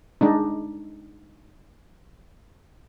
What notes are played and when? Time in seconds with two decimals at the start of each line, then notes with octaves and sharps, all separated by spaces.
0.21 G#3 D4 D#4